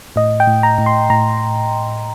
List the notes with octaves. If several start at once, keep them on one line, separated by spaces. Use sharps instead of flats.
A2 D#5
G5
A2
A#5
A2
C6
A2 A#5